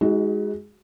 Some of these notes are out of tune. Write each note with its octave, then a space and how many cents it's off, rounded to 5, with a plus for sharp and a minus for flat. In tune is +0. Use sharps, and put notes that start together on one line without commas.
G#3 +0 D#4 +30 F#4 +20